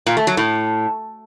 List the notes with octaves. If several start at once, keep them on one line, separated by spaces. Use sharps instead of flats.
A#2
A3
F#3
A2